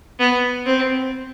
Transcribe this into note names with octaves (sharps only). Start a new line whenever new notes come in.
B3
C4